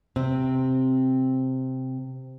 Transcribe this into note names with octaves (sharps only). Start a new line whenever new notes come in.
C3 C4